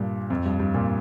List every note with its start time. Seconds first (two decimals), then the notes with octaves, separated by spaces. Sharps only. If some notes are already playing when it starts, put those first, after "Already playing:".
Already playing: G2 A#2
0.30 F2
0.45 G2
0.60 G2
0.75 A#2